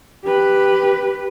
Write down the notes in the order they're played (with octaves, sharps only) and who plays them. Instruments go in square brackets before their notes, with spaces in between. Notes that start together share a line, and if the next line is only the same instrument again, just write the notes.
[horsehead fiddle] G4 B4